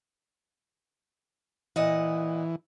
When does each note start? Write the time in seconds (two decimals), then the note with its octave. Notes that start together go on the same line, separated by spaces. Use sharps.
1.76 A#2 E3 D#5 F#5